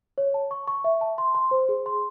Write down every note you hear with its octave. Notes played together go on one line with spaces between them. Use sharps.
C#5
A5
C#6
C#6
E5
A5
C6
C6
C5
G#4
C6